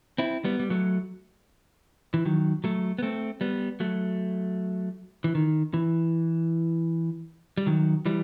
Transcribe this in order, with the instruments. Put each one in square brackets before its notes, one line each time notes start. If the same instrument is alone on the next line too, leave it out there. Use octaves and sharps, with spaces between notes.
[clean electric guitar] C4 E4
G3 B3
G3
F#3 A3
E3
D#3 F#3
F#3 A3
B3
A3 C4
G3 B3
F#3 A3
E3
D#3
E3
G3
D#3 F#3
E3 G3